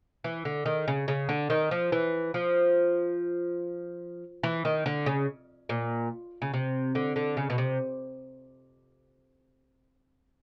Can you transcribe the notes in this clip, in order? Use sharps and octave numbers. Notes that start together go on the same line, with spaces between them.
E3
D3
D#3
C#3
C#3
D3
D#3
F3
E3
F3
E3
D#3
D3
C#3
A#2
C#3
C3
D3
D3
C#3
B2
C3